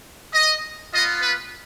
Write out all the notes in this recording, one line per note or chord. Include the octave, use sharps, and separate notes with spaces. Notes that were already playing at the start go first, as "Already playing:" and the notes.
D#5
B3 F4 D#5
B4